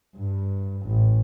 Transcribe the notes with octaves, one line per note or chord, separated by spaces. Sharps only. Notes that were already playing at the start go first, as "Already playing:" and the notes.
G2
A1